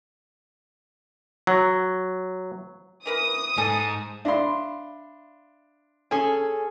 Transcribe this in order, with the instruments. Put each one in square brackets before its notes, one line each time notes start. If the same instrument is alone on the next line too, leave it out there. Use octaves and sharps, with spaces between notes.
[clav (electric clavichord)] F#3
[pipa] E3 A#4 B4 [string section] D#6
[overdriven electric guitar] G#2 [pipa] A4 G#5 A5
[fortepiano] D4 C6 [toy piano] E5 F5 B5
[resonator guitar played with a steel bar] C#4 A4 [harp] G#4 G#5